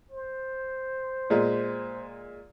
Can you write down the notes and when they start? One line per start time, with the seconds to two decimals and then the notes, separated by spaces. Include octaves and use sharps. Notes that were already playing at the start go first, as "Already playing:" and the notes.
0.11 C5
1.30 A#2 G#3